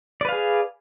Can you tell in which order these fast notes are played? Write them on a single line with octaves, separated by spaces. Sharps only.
D5 B4 F5 G#4